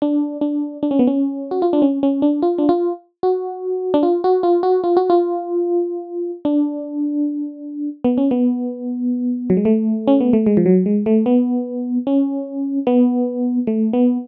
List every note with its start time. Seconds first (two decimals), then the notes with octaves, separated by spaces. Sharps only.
0.02 D4
0.41 D4
0.83 D4
0.91 C#4
0.99 B3
1.07 C#4
1.51 F#4
1.62 F4
1.73 D4
1.82 C#4
2.03 C#4
2.22 D4
2.42 F4
2.58 D4
2.69 F4
3.23 F#4
3.94 D4
4.03 F4
4.24 F#4
4.43 F4
4.63 F#4
4.84 F4
4.97 F#4
5.10 F4
6.45 D4
8.04 B3
8.18 C#4
8.31 B3
9.50 F#3
9.57 G#3
9.65 A3
10.08 C#4
10.21 B3
10.33 A3
10.46 G#3
10.57 F3
10.66 F#3
10.86 G#3
11.06 A3
11.26 B3
12.07 C#4
12.87 B3
13.67 A3
13.93 B3